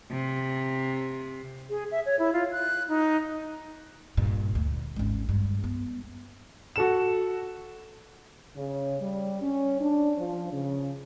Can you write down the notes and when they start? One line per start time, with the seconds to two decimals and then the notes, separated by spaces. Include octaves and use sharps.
0.11 C3
1.70 G#4
1.91 E5
2.06 C#5
2.19 E4
2.33 F4
2.52 F#6
2.89 D#4
4.17 G2 A#2
4.55 D2
4.96 G#1 C#4
5.29 G2
5.64 B3
6.76 F#4 A4 E7
8.57 C#3
9.01 G3
9.42 C#4
9.81 D4
10.18 F3
10.53 C#3